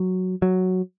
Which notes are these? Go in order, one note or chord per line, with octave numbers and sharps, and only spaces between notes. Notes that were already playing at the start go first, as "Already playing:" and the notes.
Already playing: F#3
F#3